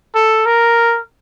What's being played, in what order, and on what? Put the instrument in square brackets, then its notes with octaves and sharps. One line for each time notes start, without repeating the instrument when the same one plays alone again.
[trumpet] A4
A#4